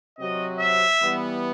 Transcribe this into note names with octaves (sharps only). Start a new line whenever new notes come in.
C3 F#3 C4 F#4 D#5
E5
E3 G3 B3